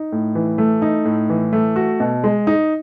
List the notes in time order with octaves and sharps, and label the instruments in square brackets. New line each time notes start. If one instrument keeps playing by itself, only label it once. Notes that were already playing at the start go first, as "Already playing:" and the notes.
Already playing: [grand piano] D#4
A2
E3
A3
D#4
A2
E3
A3
F#4
B2
G#3
D#4